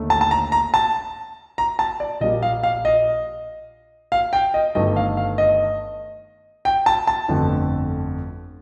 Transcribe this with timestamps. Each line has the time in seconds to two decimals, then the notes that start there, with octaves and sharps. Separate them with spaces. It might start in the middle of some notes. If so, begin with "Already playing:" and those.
Already playing: D#2 D3 A3
0.10 A5
0.21 A5
0.31 A#5
0.52 A#5
0.74 A5
1.58 A#5
1.79 A5
2.00 D5
2.21 A#1 A#2 G3 A#3 D#5
2.42 F5
2.63 F5
2.85 D#5
4.12 F5
4.33 G5
4.54 D#5
4.75 G1 G2 D#3 A3 D#5
4.96 F5
5.17 F5
5.38 D#5
6.65 G5
6.86 A5
7.07 A5
7.28 G1 F2 D3 A3